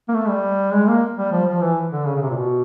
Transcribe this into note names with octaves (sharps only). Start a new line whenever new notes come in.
A#3
A3
G3
G#3
A#3
G3
F3
F3
E3
D3
C#3
C#3
C3
A#2
B2